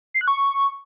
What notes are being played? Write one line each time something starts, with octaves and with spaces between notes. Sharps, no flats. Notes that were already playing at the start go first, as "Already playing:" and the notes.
C7
F#6
C#6